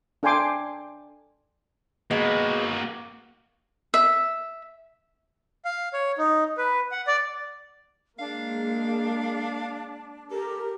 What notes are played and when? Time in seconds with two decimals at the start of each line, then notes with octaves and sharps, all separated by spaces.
0.23 D4 A4 G5 G#5 C6 D6
2.11 G#3 A#3 B3 F#4
3.94 E5
5.65 F5
5.93 C#5
6.18 D#4
6.58 B4
6.92 F#5
7.07 D5
8.19 G#3 A#3 D4 F5
10.31 G4 A4 A#4